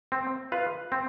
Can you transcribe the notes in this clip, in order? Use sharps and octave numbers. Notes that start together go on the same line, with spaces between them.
C4
F4 B4 F5
C4